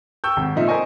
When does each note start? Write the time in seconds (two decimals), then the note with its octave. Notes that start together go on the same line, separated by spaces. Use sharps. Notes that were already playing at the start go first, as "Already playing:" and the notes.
0.24 G5 C#6 E6 G6
0.37 G#1
0.55 A#2 F3 D#4 E5
0.68 A#4 C5 D#5 G#5 C#6